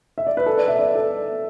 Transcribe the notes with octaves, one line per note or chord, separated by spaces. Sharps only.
E5
D5
B4
A4
D5
E5
D5
A4